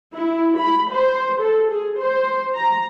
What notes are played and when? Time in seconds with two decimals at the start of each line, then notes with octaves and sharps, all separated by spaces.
0.15 E4
0.57 B5
0.92 C5
1.41 A4
1.71 G#4
1.99 C5
2.55 A#5